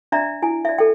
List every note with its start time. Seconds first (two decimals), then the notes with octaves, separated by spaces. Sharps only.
0.12 D4 D5 E5 A#5
0.42 E4 G#5
0.65 D5 E5
0.78 A4 G5